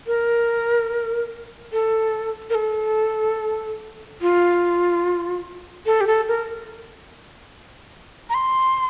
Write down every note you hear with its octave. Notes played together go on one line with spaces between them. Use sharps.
A#4
A4
A#4
A4
F4
A4
G4
A4
A#4
A#5
C6